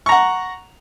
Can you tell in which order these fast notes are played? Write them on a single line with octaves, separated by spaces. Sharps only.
C#6 A#5 F#5